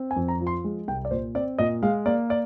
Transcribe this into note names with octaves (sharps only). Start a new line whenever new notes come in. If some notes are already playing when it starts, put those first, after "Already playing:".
Already playing: C4
G#5
F2
A#5
F3
C6
G#3
C2 G5
D5
A#2 C5
C4 D5
A#2 D#5
G#3 F5
A#3 D5
D5